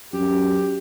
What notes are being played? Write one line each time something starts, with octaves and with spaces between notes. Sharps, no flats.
F#2 G4